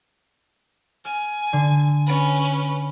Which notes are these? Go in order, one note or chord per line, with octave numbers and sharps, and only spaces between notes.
G#5 F6
D3
C#4 B4